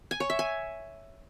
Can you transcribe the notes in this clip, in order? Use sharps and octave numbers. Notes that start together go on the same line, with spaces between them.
G#5
C#5
E5
G#5